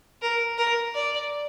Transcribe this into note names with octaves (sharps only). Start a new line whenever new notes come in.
A#4
A#4
D5